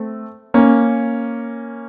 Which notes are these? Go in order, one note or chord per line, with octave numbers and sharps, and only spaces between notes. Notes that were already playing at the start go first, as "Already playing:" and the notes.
Already playing: A3 C4
A#3 C#4